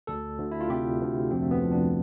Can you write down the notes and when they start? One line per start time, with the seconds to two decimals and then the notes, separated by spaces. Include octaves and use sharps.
0.07 D2 A4
0.38 D2
0.51 E4
0.61 F4
0.69 C3 G4
1.01 D2
1.31 F2 C4
1.42 A3
1.51 B3
1.62 F3
1.71 D4